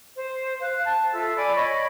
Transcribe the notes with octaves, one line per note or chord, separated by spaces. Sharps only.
C5
C5 F5 F#6
A5
F4 A4 E5 E6
D5 G#5 B5
C#5 D#5 B5 C#6